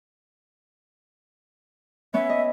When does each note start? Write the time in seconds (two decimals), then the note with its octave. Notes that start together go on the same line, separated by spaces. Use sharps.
2.14 B3 C#4 E5
2.29 D#5